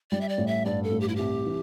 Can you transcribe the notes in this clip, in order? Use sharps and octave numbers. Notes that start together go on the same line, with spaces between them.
G3 D5
E5
D5
A1
E5
G2 D5
A4
A1
G4
E4
C2 G4
E3